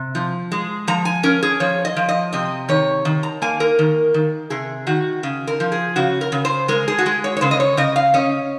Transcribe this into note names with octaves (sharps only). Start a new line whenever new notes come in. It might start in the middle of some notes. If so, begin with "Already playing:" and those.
Already playing: C3
F3
G#3
F3 A#5
G#5
C#4 A#4
G#4
F3 C#5
D#5
F3
D#5
C3 D#5
D#3 C#5
D#3
A#5
A#3 G#5
A#4
D#3
D#3
C3 G#4
D#3 F#4
C#3
A#4
F3
G#4
C#3 F#4
A#4
C#3
C5
G#3 A#4
G#4
F#4
G#3 G#4
C#5
C#5
C#3 C5
D#5
C#5
C#3 D#5
F5
C#4 D#5